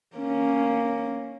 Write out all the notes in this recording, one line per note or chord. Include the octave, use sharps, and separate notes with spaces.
A#3 C#4